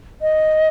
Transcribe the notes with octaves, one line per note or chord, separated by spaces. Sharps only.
D#5